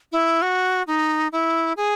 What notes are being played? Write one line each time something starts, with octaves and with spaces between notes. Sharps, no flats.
E4
F#4
D#4
E4
G#4